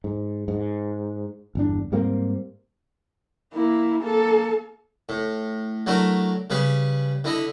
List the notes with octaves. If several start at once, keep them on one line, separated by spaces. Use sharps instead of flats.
G#2
G#2
G1 E2 D4
G#2 G3 A#3 C4
A#3 E4
A#3 A4
A2
F#3 A3 D4 E4 A#4
C#3 G3 G#4 B4
D3 E4 D#5 B5